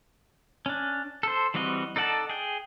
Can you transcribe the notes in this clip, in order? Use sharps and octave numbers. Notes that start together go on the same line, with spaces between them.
C#4 D4
A4 C5
E3 G3 C4 F#4 D#5
D#4 A4 D5 F#5 A5
G#4 G5